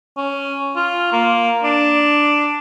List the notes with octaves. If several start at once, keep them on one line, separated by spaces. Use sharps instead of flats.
C#4
F4
A#3
D4